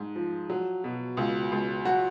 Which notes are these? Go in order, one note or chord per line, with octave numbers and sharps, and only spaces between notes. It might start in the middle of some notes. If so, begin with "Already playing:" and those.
Already playing: G#2
F3
F#3
B2
C#2
C#2
F#3 F#4